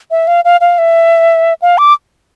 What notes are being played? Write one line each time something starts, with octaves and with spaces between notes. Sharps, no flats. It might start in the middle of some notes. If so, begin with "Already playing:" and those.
E5
F5
F5
F5
E5
F5
D6